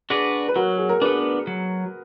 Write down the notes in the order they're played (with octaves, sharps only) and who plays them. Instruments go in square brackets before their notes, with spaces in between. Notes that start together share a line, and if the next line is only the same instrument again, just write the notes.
[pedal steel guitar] D4 F#4 B4 D5 [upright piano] G#4
[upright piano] B4
[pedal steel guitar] F#3 [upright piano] F#4 A#4
[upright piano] G#4
A#4
[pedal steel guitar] B3 D4 [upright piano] G#4 B4
[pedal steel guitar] F#3